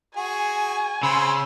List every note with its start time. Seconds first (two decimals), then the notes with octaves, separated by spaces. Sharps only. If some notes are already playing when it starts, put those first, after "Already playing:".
0.17 F#4 G#4 G#5
1.03 C#3 C5 B5 E6